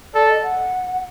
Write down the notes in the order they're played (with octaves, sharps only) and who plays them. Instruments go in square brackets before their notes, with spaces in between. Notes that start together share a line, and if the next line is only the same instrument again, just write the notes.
[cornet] A4 [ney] D5
[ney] D#5
F#5